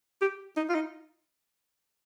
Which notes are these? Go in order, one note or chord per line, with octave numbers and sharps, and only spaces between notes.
G4
D#4
F4
D#4